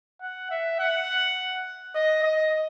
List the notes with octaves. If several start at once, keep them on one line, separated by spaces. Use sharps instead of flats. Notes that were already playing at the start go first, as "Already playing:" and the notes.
F#5
E5
F#5
D#5
D#5